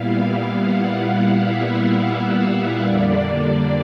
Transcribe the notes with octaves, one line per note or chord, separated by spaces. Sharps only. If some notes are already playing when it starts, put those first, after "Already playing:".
Already playing: A#2 G3 B3 E4 F5
F#5
E5
F2 D3 G3 A#3 D4 D5